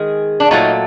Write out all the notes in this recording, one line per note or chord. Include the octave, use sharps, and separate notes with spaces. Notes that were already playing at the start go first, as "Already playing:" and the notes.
Already playing: D#3 G#3 G#4
D4
A#2 F#3 A3 D#4